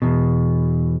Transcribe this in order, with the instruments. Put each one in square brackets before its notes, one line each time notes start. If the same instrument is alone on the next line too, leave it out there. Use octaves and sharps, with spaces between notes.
[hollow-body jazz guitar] E2 B2